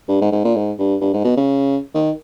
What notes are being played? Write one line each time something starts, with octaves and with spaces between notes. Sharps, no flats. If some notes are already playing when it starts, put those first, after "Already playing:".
G2
G#2
G#2
A#2
G#2
G2
G2
G#2
B2
C#3
D#3